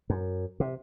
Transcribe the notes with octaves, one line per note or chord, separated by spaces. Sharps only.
F#2
C3